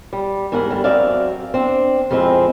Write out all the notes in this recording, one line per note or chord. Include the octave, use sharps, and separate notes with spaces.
G3
E2 G#2 G3 A#4 F#5
G2 D3 A3
F#2 C4 F#4 D5 E5 F5
C4 D4
F2 F3 G#3 C4 E4